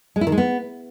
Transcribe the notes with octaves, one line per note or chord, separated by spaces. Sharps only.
G#3
E4
D#3
G#3
B3